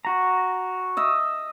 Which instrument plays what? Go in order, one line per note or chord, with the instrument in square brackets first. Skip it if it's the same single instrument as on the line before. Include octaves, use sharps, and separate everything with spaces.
[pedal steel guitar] F#4 A#5
[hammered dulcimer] D#5 E5